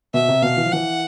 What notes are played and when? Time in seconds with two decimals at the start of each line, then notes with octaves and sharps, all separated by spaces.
0.14 B2 E5
0.28 C3
0.42 B2 F5
0.57 E3
0.66 F3
0.72 E3 F#5